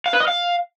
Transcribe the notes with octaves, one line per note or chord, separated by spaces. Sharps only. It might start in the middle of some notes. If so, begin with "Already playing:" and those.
F5
B4
D#5
F5